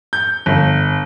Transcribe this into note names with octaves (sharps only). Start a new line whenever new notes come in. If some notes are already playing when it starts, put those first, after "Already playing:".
G6
G1